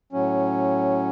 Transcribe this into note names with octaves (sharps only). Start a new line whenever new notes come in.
A2 F#3 C#4